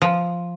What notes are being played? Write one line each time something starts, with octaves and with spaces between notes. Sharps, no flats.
F3